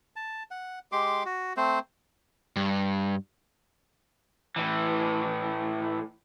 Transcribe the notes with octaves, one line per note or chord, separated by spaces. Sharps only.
A5
F#5
G#3 G4 C6 D6
F#4
A3 C4 C5
G2
A2 E3